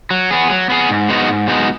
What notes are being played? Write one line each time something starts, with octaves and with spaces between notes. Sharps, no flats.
F#3
B3 G#4
F#3
B3 G#4
G#2
G#3 B3 D#4 F#4
G#2
G#3 B3 D#4 F#4